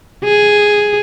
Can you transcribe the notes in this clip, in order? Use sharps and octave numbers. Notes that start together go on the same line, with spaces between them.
G#4